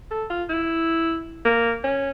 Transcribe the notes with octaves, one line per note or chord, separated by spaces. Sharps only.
A4
F4
E4
A#3
C#4